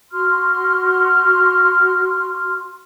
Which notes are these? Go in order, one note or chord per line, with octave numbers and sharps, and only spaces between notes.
F#4 C6 F6